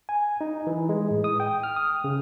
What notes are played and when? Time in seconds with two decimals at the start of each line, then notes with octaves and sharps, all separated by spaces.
0.09 G#5
0.41 D#4
0.67 E3
0.89 G#3
1.11 A2
1.24 D#6
1.40 G5
1.63 F6
1.76 D#6
2.04 C#3